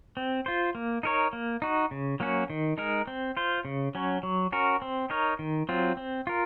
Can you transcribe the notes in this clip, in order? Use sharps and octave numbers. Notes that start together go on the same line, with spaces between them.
C4
F4 C5
A#3
D#4 A#4 C#5
A#3
D#4 F#4
C#3
F#3 A#3 C#4 F#4
D#3
G#3 D#4 A#4
C4
F4 C5
C#3
F#3 C#4
F#3
C#4 F#4 A#4
C4
D#4 A#4 C#5
D#3
F#3 C4 F4
C4
F4 A#4